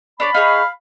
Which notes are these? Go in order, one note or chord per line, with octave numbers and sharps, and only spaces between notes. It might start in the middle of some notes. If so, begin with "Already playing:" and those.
D4 C#5 D5 B5
D#4 G#4 C#5 F5